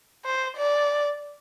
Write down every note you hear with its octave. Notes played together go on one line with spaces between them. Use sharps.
C5
D5